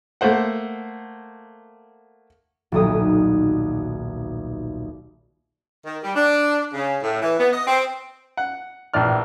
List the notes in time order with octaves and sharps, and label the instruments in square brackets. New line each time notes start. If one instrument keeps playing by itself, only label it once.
[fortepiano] A3 A#3 C5 F#5
[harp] D#1 B1 D#6
[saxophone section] D#3
G3
D4
C#3
A2
E3
B3
D#5
C4
[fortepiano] F#5
A#1 A2 E3 D5 F6